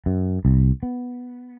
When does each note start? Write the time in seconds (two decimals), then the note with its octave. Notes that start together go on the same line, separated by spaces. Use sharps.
0.06 F#2
0.45 C2
0.83 B3